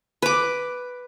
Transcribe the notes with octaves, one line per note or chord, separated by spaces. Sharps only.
B4 D6